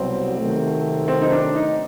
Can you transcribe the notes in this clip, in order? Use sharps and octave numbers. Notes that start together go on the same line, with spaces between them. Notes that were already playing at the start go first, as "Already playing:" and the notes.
Already playing: C2 B2 F#3 C4
C3 D#3 F#3 A3
C4
D#4
D4
D#4